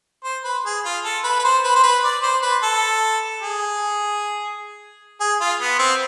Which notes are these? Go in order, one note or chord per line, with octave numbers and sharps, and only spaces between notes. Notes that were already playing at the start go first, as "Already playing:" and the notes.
C5
B4
G#4
F4
A4
B4
B4
C5
B4
C5
B4
D5
C5
B4
A4
G#4
G#4
F4
B3
C4